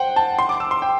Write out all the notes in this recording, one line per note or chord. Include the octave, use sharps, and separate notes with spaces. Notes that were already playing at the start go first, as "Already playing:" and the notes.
Already playing: C5 F#5 G5
A5
C6
D6
E6
C6
G5